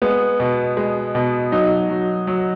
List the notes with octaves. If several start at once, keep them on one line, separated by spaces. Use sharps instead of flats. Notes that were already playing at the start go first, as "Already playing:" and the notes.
G#3 B3
B2
G#3
B2
F#3 D#4
F#3
F#3